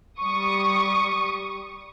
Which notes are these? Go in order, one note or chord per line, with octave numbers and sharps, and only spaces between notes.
G3 C#6 D#6